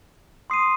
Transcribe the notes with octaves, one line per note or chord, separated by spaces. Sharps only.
C6 D#6 C7 D#7